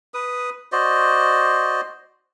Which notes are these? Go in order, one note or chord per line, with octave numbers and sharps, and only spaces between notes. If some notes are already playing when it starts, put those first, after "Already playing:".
B4 D#6
F#4 C5 D5 D#5